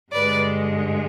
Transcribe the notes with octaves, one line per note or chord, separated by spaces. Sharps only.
G2 D3 G#3 B4 D5